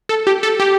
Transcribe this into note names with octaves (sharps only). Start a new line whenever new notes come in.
A4
G4
A4
G4